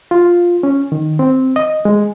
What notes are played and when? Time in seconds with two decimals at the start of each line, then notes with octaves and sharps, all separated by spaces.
0.11 F4
0.63 C#4
0.92 D#3
1.19 C4
1.56 D#5
1.85 G#3